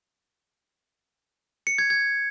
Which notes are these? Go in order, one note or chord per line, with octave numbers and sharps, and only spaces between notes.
C#7
G#6
G#6